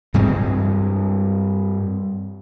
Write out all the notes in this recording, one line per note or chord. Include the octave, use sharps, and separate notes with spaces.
G2 G3 G#3 C4